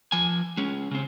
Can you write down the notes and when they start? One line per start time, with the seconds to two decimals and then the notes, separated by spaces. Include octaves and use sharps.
0.12 F3 G#5
0.57 G#3 C#4
0.91 C#3 C4